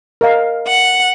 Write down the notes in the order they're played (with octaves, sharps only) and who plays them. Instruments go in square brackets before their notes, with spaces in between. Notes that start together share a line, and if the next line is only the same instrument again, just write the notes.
[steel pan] A#4 D#5 F5
[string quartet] F#5